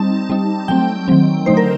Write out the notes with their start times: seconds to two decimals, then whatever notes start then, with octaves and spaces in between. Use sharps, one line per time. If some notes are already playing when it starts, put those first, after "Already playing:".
Already playing: G3 C4 D#4 A5
0.30 G3 C4 D#4
0.68 F#3 A3 C4 G5
1.08 D#3 F#3 C4
1.46 D3 F#3 A3 D#4 C5
1.57 A#4